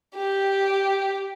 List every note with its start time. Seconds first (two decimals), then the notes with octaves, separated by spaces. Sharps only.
0.16 G4